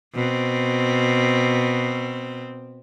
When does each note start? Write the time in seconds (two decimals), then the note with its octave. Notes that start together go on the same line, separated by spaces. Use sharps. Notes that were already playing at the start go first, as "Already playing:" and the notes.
0.14 B2 C4